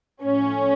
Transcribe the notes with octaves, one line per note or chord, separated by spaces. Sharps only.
A2 F3 A3 C#4